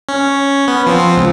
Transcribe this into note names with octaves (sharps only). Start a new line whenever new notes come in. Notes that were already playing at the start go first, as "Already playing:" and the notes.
C#4
B3
F3 C4
C#2